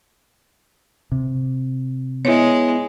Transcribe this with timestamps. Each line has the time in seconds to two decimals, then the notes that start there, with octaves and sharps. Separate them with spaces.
1.12 C3
2.25 G#3 B3 E4 C#5